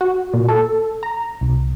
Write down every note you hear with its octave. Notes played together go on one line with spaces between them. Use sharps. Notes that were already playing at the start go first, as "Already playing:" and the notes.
F#4
A#2
A4
A#5
C2